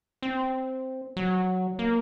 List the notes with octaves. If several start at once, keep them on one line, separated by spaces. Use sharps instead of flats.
C4
F#3
A#3